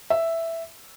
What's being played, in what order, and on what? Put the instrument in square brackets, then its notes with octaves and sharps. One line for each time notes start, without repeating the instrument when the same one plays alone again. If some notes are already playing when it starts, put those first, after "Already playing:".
[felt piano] E5